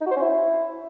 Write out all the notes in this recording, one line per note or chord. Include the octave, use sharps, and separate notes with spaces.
D#4
F#4
C5
C#4
E4